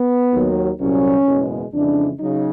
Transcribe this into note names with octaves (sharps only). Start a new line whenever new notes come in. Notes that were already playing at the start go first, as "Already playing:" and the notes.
Already playing: B3
D#2 D#3 F#3
C2 A#2 F#3 C#4
F#1 E2 B2 G#3
F2 C#3 E3 G#3 D4
C#3 F#3 D#4